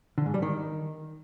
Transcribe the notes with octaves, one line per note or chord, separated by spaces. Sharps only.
D3
G#2
G3
D#3